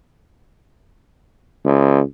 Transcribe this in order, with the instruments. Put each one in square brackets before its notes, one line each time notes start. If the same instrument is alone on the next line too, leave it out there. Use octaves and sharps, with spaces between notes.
[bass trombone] C#2